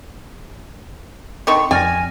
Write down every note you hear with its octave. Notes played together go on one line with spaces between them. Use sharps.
D3 D#3 C4 C#6
F2 D5 G#5 F6 A#6